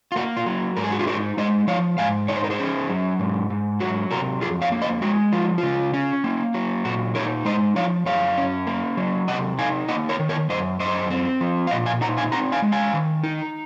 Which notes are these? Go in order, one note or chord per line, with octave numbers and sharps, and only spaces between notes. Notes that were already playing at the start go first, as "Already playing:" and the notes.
F4
A#3 F#4
F4
F#3
G#2 A#4
G#4
F#4
F4 G#4
D#4 F#4 A#4
G#3 C5 D#5
F3 C#5 F5
G#2 F5 G#5
D#4 C#5
C5
A#4
G#4 C5
C#4
F#3
G#2
G#2
F#3 F#4
C3 F#4 A#4
F2 F4 G#4
C#5 F5
A#3
C5 D#5
G#3 F#4
F3 F4
C#3 F4
C#4
A#3
F#3
A#2 F#4
D#4 A#4 C#5
G#3 C5 D#5
F3 C#5 F5
F#2 C#5 F5
C#4
A#3
F#3
C3 D#5 F#5
D#4 F5 G#5
A#3 D#5 F#5
A#4 C#5
D#3
A#4 C#5
F#2 C5 D#5
F#2 C5 D#5
C4
F3
F5
A#2 D#5 F#5
F5 G#5
D#4 F#5 A#5
F5 G#5
C4 F#5 A#5
F5 G#5
G#3
F5 G#5
D#3
D#4